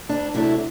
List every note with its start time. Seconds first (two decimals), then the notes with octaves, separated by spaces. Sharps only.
0.09 D2 D4
0.34 C3 F#3 A3 D4 E4